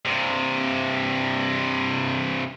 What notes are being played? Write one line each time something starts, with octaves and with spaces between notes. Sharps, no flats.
G2 C3